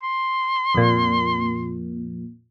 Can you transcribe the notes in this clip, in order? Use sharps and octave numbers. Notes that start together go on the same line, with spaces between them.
C6
F2 A#2